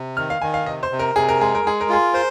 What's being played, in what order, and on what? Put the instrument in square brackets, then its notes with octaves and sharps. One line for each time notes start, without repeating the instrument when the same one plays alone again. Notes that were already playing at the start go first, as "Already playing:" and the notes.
Already playing: [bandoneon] C3
[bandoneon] D#3 [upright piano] F6
[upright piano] F5
[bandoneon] D#3 [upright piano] G#5
[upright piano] F5
[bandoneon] C3 [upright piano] D#5
[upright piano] C5
[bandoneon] C3
[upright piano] A#4
[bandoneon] C3 [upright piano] G#4
[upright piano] A#4
[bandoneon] G#3 [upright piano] G#4
[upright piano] A#4
[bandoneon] G#3 [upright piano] G#4
[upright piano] A#4
[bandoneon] F4 [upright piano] G#4
[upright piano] A#4 [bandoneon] C5